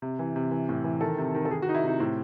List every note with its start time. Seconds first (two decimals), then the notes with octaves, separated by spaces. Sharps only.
0.02 C3
0.19 E3
0.36 C3
0.51 E3
0.69 A2
0.84 E3
1.01 D#3 A4
1.18 C3
1.35 D#3
1.45 A4
1.50 D#3 G#4
1.62 F#4
1.68 D#3 D#4
1.75 E4
1.83 C3 D#4
2.00 A2 C4